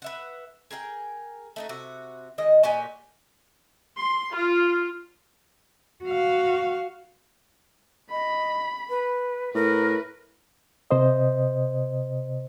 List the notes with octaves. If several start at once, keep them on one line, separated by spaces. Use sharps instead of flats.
B4 E5 F#5
G#4 A#4 F5 G5
A3 D#4 F#4
C3 F#4
D#3 G#3 D#5
A#2 F#4 G4 G#5
C6
F4
F#4 F5
D#5 B5
B4
A2 A#4 B4
C3 C5 D#5